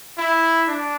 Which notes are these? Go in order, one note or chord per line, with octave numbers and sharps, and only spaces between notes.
E4
D4